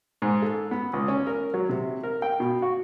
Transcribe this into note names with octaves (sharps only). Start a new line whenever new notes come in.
G#2
A4
B3
C#2
C#4
A#4
F#3
C3
A#4
G5
B2
F#4